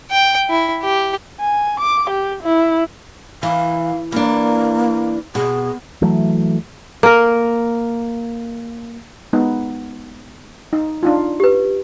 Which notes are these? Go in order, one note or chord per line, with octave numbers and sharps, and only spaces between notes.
G5
E4
G4
G#5
D6
G4
E4
E3 F5
E3 A#3 D4
B2 G#4
E3 F#3 A3
A#3 A#4
G#3 B3 D#4
D#4
D4 D#4 F4
G4 B4